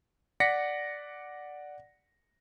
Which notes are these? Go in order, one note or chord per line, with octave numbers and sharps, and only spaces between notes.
D5 F#5 A#6 B6 C#7